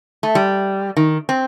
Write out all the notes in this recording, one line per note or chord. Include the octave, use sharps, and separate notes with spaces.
A3
G3
D#3
C4